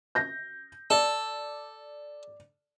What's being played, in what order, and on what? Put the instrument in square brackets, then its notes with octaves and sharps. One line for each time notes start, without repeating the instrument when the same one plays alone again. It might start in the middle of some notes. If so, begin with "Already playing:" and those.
[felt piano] G6 A#6
[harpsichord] A4 [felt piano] D5